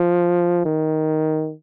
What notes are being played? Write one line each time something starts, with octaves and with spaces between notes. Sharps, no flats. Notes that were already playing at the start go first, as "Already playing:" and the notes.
Already playing: F3
D#3